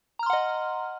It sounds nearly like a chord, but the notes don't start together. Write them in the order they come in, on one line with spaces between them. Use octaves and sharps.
A#5 F6 C6 F#5 D#5